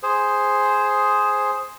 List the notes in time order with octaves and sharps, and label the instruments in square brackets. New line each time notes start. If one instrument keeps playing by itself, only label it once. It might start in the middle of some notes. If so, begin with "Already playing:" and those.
[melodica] G#4 C5